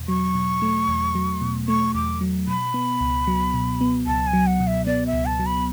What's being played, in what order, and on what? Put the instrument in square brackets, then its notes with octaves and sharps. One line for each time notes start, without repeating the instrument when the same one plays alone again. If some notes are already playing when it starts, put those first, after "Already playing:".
Already playing: [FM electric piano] E2 B2
[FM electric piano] F#3 [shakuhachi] C#6
[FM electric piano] B2
A3
E2
F#3
B2
[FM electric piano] A3 [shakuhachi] C#6
[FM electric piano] E2 [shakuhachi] D6
[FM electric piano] F#3
[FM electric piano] B2 [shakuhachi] B5
[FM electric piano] B3
C#2
F#3
B2
B3
[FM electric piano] C#2 [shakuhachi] A5
[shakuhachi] G#5
[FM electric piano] F#3
[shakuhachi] F#5
[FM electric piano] B2
[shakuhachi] E5
[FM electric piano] B3 [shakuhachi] D5
[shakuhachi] E5
[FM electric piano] C#2
[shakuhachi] A5
[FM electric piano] F#3
[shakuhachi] B5